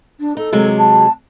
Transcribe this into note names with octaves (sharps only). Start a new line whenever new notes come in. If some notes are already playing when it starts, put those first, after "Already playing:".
D4
D#4 A4
C3 F#3 G#3
A5